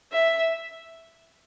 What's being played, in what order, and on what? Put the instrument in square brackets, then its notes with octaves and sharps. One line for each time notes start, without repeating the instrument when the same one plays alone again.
[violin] E5